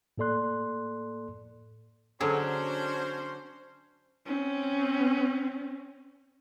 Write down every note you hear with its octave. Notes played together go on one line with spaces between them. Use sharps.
A2 A#3 A4 D5 C6 F#6
D3 F#3 C#4 D4 F#4 G#4 C5
C4 C#4